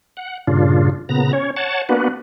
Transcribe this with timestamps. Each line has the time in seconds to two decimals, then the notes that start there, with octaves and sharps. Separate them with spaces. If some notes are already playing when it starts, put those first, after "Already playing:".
0.17 F#5
0.47 G2 A#2 C#3 D4 F4
1.09 A#2 C#3 B3 A#5
1.33 C#4 C#5
1.56 C#5 F#5 A5
1.89 A#3 B3 D4 F#4 B4